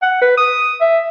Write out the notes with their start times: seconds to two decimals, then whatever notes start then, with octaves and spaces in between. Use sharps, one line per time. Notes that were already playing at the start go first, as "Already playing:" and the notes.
0.02 F#5
0.21 B4
0.37 D#6
0.81 E5